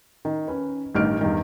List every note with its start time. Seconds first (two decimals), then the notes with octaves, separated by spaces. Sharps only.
0.25 D#3
0.48 C#4 B4
0.95 A1 G2 D#3 F6 D7
1.21 E2 G2 D#3